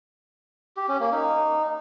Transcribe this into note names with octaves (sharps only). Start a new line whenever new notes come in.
G4
C#4
A#3
D#4